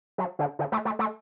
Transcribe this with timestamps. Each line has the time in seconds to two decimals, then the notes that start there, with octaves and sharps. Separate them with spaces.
0.18 F#3
0.39 D3
0.59 D3
0.72 A3
0.85 A3
0.99 A3